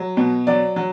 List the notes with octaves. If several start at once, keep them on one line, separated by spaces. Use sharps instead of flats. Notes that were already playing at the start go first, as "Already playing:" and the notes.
Already playing: F#3
B2
F#3 D5
F#3